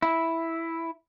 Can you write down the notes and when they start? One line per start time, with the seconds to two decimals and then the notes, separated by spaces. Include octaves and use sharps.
0.02 E4